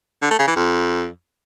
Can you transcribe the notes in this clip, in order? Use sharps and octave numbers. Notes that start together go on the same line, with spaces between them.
D3
A3
C#3
E3
F2